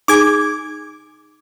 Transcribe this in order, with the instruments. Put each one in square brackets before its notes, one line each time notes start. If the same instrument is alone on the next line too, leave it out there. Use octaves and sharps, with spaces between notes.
[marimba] D#4 G#4 G#5 [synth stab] D6 G#6